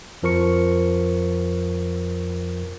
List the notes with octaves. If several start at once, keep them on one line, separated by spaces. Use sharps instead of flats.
F2 F3 A#4 C#6 C#7